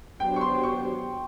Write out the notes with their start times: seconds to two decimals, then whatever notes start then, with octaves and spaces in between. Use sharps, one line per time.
0.20 F#3 B3 D4 G4 C5 G5
0.36 C#6
0.41 C6
0.63 C#6